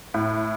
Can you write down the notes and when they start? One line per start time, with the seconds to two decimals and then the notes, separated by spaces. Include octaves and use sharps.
0.14 A2